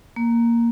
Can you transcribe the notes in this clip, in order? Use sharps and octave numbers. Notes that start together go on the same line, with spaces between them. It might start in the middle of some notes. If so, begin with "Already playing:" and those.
A#3